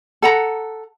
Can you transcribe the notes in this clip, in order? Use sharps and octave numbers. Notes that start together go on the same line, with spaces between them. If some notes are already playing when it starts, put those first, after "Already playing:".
A4 F#5 A#5